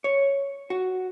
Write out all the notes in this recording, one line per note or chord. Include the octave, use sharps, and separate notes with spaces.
C#5
F#4